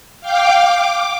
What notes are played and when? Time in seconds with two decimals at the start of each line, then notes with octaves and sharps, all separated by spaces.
0.21 F5 G5 D6
0.60 D6